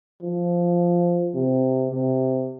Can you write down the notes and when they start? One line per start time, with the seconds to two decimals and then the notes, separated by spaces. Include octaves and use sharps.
0.22 F3
1.34 C3
1.90 C3